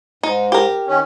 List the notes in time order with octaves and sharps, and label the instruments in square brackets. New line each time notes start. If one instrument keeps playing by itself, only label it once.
[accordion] G#2 [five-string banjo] D#4
[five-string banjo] G4 A#4
[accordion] D#3 C#4